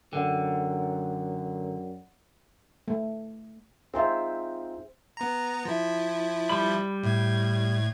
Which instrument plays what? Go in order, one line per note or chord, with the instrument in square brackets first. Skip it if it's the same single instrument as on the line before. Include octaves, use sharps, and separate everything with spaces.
[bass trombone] F#2 [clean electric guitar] D3 [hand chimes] D5 F#5 G5
[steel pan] A3
[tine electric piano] C4 D#4 F4 [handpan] G#4 C5 E5
[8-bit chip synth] B3 A#5
F3 E4
[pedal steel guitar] G3 B5
[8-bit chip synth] A2 G#6